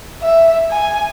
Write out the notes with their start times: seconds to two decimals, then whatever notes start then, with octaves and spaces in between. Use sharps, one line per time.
0.22 E5
0.71 G#5